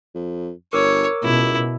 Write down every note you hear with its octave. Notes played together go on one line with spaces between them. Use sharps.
F2
G1 A#4 C#5 D6 E6
C#2 B2 E4